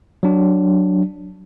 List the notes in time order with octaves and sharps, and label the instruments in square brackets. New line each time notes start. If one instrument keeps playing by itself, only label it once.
[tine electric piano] F#3 D4